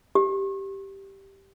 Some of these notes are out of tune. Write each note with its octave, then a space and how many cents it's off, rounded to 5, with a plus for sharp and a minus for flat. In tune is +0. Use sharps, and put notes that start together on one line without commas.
G4 -5